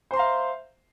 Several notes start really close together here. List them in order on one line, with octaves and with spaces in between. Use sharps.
C5 C6 A#5 F5 E5